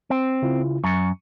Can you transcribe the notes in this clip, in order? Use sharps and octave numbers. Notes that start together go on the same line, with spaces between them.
C4
C#3 E4 F4
F#2 C#6 C#7